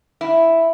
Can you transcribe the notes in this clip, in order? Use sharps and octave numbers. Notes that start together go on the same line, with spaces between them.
E4